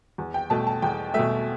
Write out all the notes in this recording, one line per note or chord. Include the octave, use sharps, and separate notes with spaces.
E2
G5
B2 A3 A5
A5
E2 G5
B2 A3 E5